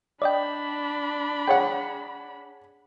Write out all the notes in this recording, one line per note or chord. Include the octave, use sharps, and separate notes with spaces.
D4 D5 D#5 G5 B5
G#4 C#5 F#5 G5